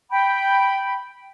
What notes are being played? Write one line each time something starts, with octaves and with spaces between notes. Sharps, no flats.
G5 B5